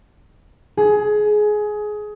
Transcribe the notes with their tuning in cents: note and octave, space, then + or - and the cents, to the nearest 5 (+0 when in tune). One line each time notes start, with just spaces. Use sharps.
G#4 +20